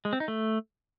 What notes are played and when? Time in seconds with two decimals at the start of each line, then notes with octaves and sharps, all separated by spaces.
0.05 G#3
0.13 C4
0.20 D#4
0.28 A3